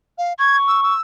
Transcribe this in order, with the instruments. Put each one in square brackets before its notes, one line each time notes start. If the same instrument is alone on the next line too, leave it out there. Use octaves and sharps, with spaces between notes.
[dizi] F5
[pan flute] C#6 [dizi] G#6
[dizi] E6
E6